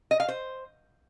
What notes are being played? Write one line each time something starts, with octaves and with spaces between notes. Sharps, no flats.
D#5
F5
C5